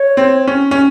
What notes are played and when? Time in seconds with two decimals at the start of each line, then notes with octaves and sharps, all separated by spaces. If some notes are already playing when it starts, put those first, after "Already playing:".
Already playing: C#5
0.17 C4
0.47 C#4
0.71 C#4